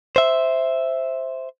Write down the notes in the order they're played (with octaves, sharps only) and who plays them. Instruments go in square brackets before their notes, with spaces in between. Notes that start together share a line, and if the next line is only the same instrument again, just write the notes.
[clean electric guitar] C5 E5